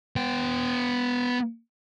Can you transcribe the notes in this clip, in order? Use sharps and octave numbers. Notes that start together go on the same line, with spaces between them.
B3 G5